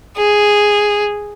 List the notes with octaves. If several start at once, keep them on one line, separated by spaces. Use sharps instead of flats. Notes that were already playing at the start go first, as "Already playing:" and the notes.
G#4